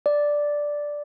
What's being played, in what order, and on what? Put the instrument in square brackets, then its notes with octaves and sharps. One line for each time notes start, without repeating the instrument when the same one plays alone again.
[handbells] D5